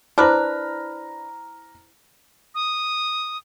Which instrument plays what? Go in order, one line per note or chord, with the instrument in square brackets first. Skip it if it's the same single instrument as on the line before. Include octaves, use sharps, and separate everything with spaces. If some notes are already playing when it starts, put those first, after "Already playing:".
[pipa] D4 B4 [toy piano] E4 C5 [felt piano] A#5 F6
[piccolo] D#6